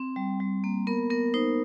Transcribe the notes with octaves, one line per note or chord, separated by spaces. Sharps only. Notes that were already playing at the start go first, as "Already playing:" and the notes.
Already playing: C4
G3
G3
A#3
B3 A#4
B3 A#4
D#4 C5